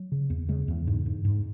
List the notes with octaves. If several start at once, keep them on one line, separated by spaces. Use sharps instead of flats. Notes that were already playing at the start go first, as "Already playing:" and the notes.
Already playing: F#3
C#3
E2
C#3 G#3
E2
G#2
G#2
G#2